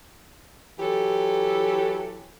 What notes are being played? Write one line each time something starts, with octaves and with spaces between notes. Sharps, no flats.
E3 F#3 G4 A4